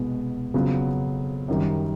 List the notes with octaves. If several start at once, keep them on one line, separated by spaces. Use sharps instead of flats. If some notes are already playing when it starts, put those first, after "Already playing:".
Already playing: C2 B2 G#3 B3
F2 C#3 F#3 B3
F#2 D#3 G3